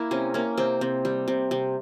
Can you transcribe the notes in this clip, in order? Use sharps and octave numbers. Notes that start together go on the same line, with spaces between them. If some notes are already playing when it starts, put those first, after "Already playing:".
Already playing: A#3 E4
C3 C#4
A#3 C#4
C3 C4
C3
G3
C3
C3